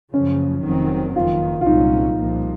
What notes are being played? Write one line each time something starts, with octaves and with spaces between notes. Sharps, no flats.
F#1 F#2 C#3 F3 C#4
F1 F2 D#3 F#3 C4
F#1 F2 D#3 F4
F4
C2 A#2 F#3 C#4 D#4
C2 A#2 F3 A#3